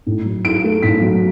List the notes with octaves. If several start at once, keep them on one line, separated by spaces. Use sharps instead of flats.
A2
F#3
E4 D7
A3
A2 B6
F#3